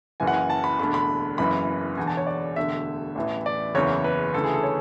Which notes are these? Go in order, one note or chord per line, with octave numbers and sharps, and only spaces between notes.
F#1 F#2 E3 G#5
F#5
G#5
A5
B5
E1 D2 D3 B5
B5
F#1 F#2 E3 B5
E1 E2 D3 G#5
A5
C#5
D5
E1 D2 D3 E5
A1 A2 E3
D5
F#1 E2 C#3 E3 C#5
B4
D2 C#3 E3 A4
G#4
A4
C#5